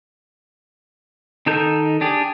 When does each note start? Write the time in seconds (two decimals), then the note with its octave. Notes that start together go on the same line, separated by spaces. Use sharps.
1.46 D#3 D#4 A4 A#4 G6
2.01 D4 G4 G#4